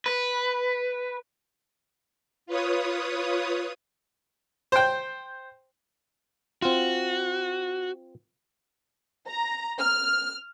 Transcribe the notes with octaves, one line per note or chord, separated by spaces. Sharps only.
B4
F4 B4 C#5 D#6
C5 G5
C4 F4 F#4
A#5
F6